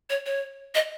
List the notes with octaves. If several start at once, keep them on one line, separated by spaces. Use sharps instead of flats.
C#5
C#5
D#5